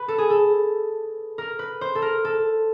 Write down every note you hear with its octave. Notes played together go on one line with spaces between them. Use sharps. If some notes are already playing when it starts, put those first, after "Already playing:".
Already playing: B4
A4
G#4
A4
A#4
B4
C5
A4
A#4
A4